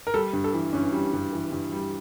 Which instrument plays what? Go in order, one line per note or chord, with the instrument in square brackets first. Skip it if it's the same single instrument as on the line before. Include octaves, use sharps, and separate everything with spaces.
[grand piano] A#4
[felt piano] G3 [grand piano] A4
[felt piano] G2
[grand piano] A4
[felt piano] E3
[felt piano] G2 [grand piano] C#4
[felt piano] G3
G2
E3
G2
G3